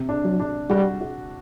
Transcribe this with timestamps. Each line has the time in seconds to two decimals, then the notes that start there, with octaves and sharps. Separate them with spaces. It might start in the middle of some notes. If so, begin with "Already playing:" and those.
Already playing: C3
0.09 D4
0.25 F#3
0.40 D4
0.70 G3 F#4
1.01 F#4